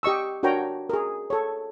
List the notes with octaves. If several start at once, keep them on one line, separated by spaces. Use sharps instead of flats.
G4 D#5 C#6 E6
D4 F#4 A#4 C#5 G5 A#5
G#4 A#4
A4 C#5